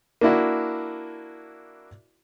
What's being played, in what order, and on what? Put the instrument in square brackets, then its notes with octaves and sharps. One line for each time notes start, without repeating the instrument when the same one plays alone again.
[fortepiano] A#3 D4 E4 F#4